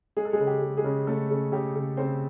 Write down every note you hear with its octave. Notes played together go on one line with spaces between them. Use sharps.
G#3 G#4
A4
G#3 G#4
C#3
G4
G#3
G#3 G#4
C#3
C#3 A3 A4
C#3
C#3 G4
C#3
C#3 C4 C5